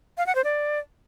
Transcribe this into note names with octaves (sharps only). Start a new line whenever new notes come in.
F5
F#5
C5
D5